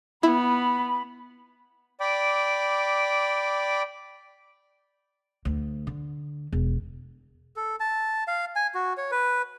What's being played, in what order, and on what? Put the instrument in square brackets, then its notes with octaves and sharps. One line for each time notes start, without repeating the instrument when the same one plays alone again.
[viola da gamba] B3 [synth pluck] E4 [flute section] B5
[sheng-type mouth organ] D5 G5 B5 D6
[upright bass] D2
D3
E1
[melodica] A4
A5
F5
G#5
F#4
C#5
B4